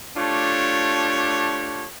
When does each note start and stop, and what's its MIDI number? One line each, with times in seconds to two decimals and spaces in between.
0.17 1.87 57
0.17 1.87 62
0.17 1.87 65
0.17 1.87 67
0.17 1.87 73